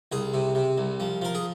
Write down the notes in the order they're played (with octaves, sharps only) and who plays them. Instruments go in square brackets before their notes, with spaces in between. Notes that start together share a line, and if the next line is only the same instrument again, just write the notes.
[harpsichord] C2 G#4
C3
C3
C2
F3
F3 A#4
G#4